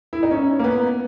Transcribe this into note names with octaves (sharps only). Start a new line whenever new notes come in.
E4
D#4
C#4
A#3
B3